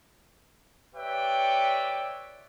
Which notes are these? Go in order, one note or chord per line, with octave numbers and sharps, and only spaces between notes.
G4 B4 C#5 D5 E5 G5